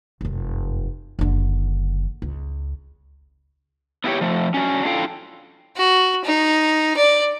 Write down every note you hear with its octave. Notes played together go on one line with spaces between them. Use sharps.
F1 F#2
F#1 D3
C#2
B3 E4 F4 G4 C#5
F3 A3
C#4 D4 F#4
D4 E4 F4 A4 F5 G5
F#4
D#4
D5